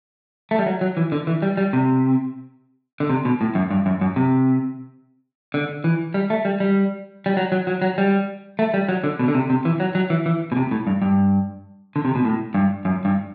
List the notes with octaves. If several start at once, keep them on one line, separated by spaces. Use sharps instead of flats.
A3
G3
F#3
F#3
E3
D3
E3
G3
G3
C3
D3
C3
B2
A2
F#2
G2
F#2
F#2
C3
D3
E3
G3
A3
G3
G3
G3
F#3
F#3
F#3
F#3
G3
A3
G3
F#3
D3
B2
D3
C3
C3
E3
F#3
F#3
E3
E3
B2
C3
A2
G2
G2
D3
C3
B2
A2
G2
F#2
G2